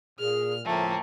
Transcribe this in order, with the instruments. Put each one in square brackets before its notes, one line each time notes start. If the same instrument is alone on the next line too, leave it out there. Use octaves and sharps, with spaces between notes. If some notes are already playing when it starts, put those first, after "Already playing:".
[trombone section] A#2 [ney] G#4 [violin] F6
[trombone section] C#2 A2 F3 [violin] A3 A#3 [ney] G5